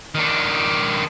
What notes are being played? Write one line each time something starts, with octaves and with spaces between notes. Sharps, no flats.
D#3 D4